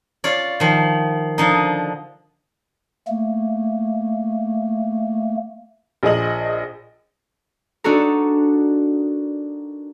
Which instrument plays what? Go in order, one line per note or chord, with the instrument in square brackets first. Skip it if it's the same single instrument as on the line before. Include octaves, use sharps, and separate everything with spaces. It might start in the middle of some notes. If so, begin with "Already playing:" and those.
[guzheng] F4 C#5 D5
D#3 F3
D3 F3 D#4
[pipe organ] A3 A#3
[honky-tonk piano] A#1 G#4 D#5 F#7
[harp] D4 D#4 F#4 A4 A#4